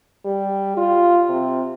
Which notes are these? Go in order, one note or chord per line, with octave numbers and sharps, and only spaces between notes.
G3
F4
C3